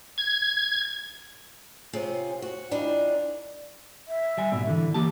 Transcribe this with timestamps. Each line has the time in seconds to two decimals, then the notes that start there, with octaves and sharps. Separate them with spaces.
0.18 G#6
1.93 C3 C4 C#4 F4 G#4
2.42 F#4
2.71 E3 G3 D4 D#4 F4
4.08 E5
4.38 G3 G#5
4.52 G#2 B2
4.67 D3 E3
4.94 E3 A#3 G4 A5